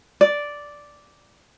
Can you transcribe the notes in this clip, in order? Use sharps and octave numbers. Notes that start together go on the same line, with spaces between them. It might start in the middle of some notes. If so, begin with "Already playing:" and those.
D5